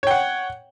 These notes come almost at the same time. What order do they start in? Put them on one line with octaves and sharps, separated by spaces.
C#5 G5 F#5